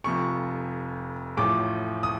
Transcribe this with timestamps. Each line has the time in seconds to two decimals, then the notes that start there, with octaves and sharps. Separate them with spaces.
0.04 F1 F2 C3 F3 C#6
1.37 A1 A2 F3 D6
2.03 D#6